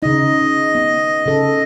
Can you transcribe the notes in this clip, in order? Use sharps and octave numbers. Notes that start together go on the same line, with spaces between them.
C#3 D#4 D#5
B3
C#3 A4